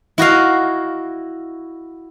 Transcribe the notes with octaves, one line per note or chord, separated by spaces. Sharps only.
E4 F#4 D#5 F5